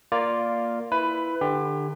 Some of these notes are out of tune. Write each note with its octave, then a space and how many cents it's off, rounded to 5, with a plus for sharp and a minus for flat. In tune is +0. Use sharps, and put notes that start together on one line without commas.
A#3 +0 F4 +0 D5 +0
E4 +0 B4 +15
D3 +30 G4 +30